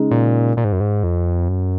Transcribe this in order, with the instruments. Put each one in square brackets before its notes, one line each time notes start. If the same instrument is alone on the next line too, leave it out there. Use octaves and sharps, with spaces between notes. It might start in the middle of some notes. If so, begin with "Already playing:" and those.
Already playing: [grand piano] C#3 G#3 D#4
[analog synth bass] A#2
A#2
G#2
F#2
G#2
F2
F#2